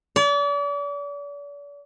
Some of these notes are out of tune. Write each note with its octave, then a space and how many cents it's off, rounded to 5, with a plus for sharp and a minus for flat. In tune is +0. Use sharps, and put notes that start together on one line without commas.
D5 -40